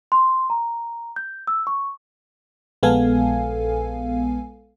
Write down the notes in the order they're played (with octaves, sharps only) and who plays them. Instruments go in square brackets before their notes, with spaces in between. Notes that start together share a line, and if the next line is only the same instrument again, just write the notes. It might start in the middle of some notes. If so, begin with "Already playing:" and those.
[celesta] C6
A#5
G6
E6
C#6
[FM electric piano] A#1 G#3 B3 A4 F5 G#5